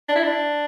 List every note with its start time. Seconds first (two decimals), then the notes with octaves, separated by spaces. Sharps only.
0.08 D4
0.15 E4
0.23 D4